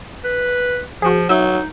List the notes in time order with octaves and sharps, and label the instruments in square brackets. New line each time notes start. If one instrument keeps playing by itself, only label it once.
[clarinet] B4
[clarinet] F3 [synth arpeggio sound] F#4 G#4
[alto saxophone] F#3 [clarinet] D#4 [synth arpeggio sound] E5